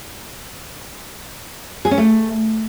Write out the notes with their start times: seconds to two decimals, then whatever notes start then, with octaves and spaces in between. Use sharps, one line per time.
1.85 G#4
1.91 C#4
1.98 A3